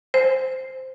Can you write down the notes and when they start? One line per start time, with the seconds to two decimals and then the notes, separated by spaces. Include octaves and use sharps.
0.14 C5